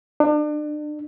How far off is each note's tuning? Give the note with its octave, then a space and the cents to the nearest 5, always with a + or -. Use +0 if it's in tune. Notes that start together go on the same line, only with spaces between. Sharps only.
D4 +35